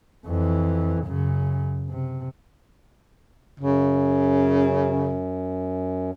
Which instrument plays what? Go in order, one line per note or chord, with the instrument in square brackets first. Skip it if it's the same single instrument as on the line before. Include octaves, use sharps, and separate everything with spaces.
[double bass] F2 E3
F#2 C#3
C3
[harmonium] F#2 [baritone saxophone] C#3